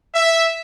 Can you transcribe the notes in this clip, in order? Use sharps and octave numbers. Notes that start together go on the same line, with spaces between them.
E5